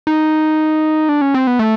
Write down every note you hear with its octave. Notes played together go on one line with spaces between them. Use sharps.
D#4
D4
C#4
C4
B3
A3